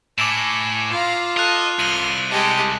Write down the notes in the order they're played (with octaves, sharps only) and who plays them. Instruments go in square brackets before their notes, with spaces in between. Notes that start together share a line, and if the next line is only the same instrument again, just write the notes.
[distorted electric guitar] A2 [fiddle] G#5 [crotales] D6 E6 E7
[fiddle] F4 [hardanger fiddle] F5 A#5
[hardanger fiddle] A4 [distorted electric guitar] D#5 [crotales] F#6 F7
[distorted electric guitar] C2 [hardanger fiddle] C6 [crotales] D#7 F#7
[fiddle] G#3 G4 [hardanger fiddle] D#5 A5